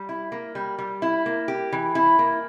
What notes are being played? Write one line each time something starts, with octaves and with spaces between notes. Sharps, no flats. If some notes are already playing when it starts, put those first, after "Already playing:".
Already playing: G3
E4
A#3
G3
G3
E4
A#3
G4
E3
E4
A#3